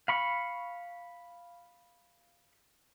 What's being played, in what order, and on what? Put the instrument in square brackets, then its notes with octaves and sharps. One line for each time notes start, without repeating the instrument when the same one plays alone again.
[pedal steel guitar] F5 B5 C#6